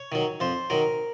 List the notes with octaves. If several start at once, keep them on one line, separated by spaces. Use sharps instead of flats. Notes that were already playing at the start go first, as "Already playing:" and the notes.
Already playing: C#5
D#3 F#3
F2 C5
D#3 F#3 A#4